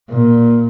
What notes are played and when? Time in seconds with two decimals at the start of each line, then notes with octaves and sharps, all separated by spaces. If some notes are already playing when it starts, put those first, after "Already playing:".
0.10 A#2